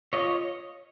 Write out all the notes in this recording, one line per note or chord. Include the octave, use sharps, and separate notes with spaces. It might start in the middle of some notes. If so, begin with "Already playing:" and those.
F4 C#5 D#5
C#5